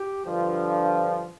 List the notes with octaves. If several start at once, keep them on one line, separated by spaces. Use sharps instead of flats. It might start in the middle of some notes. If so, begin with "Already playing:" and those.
Already playing: G4
G2 D3 F3